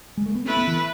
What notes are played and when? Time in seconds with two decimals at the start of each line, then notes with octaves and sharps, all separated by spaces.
0.17 G#3
0.26 A3
0.35 B3
0.45 A3 C#4 E4 B4
0.57 B3
0.67 E3